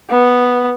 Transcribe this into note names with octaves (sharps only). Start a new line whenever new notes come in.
B3